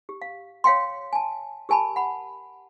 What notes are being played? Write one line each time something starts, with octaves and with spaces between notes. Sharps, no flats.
G4
F5
C#5 F5 G5 C6
G#5 A5
G4 A#4 G#5 A5 B5
F#5 B5